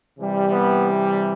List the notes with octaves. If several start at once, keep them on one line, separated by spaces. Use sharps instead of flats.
C3 E3 G3
B3